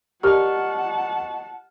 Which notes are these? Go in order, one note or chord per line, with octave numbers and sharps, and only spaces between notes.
G4 A#4 D5 D#5 F#5 A5 C#6 F6